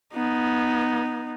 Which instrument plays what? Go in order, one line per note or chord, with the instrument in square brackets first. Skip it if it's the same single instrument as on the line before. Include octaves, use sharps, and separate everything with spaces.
[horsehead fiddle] B3 D#4